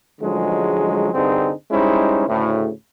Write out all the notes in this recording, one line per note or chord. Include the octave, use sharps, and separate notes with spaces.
A1 D3 F3 F#3 G#3
C2 G2 D3 C4 D#4 G#4
G3 G#3 C#4 D#4 E4 C5
D2 A2 C#3